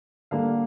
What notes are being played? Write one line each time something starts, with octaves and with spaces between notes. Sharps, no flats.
D3 G3 A#3 F5